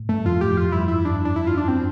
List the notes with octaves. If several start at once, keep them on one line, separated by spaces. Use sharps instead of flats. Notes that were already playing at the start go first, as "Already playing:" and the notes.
Already playing: A2
G2 A3
F2 F4
G4
F2
F4
G2 E4
E4
D4
D4
E4
F4
D4
C4